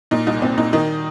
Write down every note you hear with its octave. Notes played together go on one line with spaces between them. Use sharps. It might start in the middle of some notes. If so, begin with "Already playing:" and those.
A#2 D#4
C2 D#4
A#2 C4
A#2 D#4
D#3 D#4